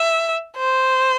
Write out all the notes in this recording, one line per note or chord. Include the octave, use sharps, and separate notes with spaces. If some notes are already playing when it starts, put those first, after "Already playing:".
Already playing: E5
C5